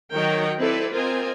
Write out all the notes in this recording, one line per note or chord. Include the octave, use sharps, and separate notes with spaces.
D#3 F#3 A#4 C#5 D#5 G5
C4 E4 A4 B4 D5
C4 F4 A#4 C5 D#5 G#5